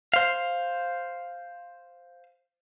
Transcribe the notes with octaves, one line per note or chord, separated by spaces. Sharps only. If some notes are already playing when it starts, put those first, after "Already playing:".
C5 F5